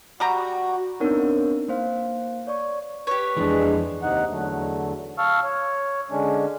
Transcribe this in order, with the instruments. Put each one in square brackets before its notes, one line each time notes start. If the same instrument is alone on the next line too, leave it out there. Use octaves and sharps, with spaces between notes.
[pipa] G3 G4 A#5 [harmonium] F#4
[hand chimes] B3 C4 D4 D#4 A#4 C#5
A#3 C5 F5
C#5 D5 C#6
[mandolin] G4 C#5 [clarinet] B4
[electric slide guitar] F2 E3 [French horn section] G#3 D4
[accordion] D#2 C3 D#4 F#5
E2 D3 F#3 A3
F5 A5 C#6 E6 F6
C#5
D3 G#3 C#4 D4